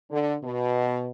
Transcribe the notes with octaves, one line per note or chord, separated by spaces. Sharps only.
D3
B2